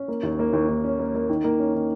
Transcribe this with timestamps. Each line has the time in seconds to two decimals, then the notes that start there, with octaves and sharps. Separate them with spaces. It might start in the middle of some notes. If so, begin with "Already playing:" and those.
Already playing: C#4
0.08 A#3
0.23 D#2
0.39 A#3
0.53 D#2
0.69 D#2
0.84 C#4
0.99 A#3
1.14 A#3
1.29 D#3
1.44 A#3
1.59 C#4
1.75 D#3